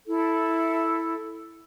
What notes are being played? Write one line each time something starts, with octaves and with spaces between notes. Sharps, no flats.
E4 A4